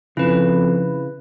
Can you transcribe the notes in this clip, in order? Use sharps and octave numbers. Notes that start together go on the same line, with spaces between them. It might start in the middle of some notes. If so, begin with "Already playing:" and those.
F2 C#3 E4 B4